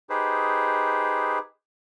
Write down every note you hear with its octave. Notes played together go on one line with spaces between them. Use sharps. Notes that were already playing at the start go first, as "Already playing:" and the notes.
D#4 G4 G#4 B4 C5